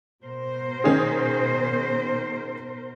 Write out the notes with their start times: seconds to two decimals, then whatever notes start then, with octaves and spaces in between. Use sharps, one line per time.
0.23 B2 A#4 C5
0.84 D#3 C#4 G#4